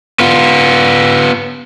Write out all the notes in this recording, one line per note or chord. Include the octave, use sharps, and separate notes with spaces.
B3 F4